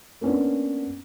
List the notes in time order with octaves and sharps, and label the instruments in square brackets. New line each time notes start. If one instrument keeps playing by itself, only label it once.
[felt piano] A#3 B3 C#4 D4